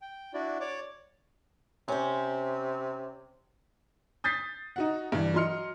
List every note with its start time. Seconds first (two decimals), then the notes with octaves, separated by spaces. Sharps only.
0.02 G5
0.34 D4 E4 F#4 D5
0.60 C#5 D5 D6
1.88 C3 C#4 C5
4.24 D#6 G6 A6 B6 C7
4.76 D#4 F#4 F#5
5.12 G2 E3
5.34 F#3 D#5 C6 F6 C#7